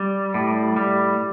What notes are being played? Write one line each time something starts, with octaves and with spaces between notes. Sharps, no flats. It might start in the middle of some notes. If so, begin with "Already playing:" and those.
Already playing: G3
A2
G3